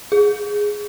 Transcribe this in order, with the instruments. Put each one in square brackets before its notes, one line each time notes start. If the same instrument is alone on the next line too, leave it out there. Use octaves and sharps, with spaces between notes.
[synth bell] G#4